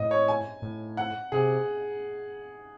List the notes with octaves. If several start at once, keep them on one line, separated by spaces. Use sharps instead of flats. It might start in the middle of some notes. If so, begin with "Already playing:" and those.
Already playing: A2 D#5
C#5
G#5
A2
F#5
C3 G#4